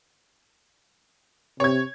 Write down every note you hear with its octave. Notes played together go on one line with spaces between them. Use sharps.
C3 C#5 G#6